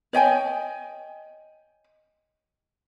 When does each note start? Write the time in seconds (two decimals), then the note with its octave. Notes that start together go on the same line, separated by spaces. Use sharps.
0.13 C#5 D#5 G5 G#5